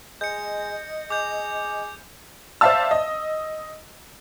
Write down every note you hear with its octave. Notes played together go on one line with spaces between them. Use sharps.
G#3 D#5 G6 C#7
G#4 D6 G6
C5 D5 E5 F5 A5 E6
D#5